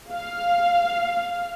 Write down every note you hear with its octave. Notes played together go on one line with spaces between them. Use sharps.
F5